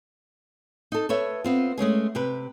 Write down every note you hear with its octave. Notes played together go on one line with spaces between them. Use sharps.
D#4 A4
A4 B4 C#5 E5
B3 C4 F4
G#3 A3 C#4 G#4
C3 G4 B4